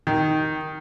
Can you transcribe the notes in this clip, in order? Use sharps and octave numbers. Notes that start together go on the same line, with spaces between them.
D#3